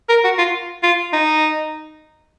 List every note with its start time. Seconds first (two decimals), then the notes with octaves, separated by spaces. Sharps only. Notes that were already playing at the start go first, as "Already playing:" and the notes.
0.09 A#4
0.24 F#4
0.38 F4
0.83 F4
1.13 D#4